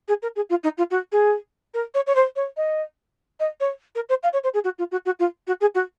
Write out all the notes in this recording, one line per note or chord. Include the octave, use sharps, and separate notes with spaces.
G#4
A#4
G#4
F4
D#4
F4
F#4
G#4
A#4
C#5
C#5
C5
C#5
D#5
D#5
C#5
A#4
C5
F5
C#5
C5
G#4
F#4
F4
F#4
F#4
F4
F#4
G#4
F#4